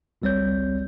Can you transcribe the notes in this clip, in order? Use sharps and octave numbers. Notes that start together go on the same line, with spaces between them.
G#1 C#2 G3 C4 C#5 G6